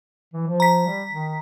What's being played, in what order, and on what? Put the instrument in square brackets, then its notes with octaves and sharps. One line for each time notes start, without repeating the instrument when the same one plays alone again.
[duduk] E3
F3
[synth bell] A#5 B6
[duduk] G3
D#3